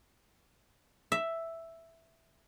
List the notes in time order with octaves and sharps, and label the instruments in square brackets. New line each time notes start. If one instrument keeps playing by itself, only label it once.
[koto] E5